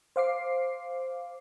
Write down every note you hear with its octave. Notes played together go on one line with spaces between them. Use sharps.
C5 F5 D6 C7